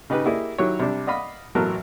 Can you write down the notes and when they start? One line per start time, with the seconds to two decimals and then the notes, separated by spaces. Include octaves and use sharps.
0.10 C#3 D#4 G4 B4
0.25 A#3 E4 G4 G#4 D5 D#5
0.58 D#3 F#3 E4 G4 C#5
0.79 C3 G3 D4
1.07 D5 D#5 F5 F#5 B5 D#6
1.55 A1 B2 F#3 A3 A#4 A5